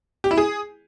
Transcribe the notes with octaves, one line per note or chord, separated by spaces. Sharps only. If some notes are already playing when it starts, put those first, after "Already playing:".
G4
E4
G#4